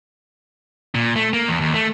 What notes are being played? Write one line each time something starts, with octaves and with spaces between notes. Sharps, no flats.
A#2
A3
A#3
E2
D#2
A3